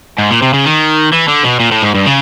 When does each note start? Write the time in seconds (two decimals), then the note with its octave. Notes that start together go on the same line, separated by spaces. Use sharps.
0.18 G#2
0.31 A#2
0.42 C3
0.54 C#3
0.66 D#3
1.12 E3
1.28 D3
1.44 B2
1.60 A#2
1.72 A2
1.83 G#2
1.95 G2
2.06 C#3